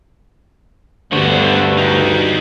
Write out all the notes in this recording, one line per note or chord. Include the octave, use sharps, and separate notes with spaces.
D2 G2 D3 B3 F#4 C5
D#4 G4